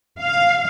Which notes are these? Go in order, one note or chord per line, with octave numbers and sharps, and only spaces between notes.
F5